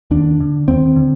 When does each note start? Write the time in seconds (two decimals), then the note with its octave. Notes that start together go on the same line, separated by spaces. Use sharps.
0.11 D#2 D4
0.40 D3
0.68 D#2 C4
0.96 D3